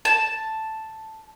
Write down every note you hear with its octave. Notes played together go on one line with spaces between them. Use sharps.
A5